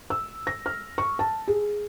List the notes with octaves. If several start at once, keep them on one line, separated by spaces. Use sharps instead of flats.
E6
A#6
F6
C#6
A5
G#4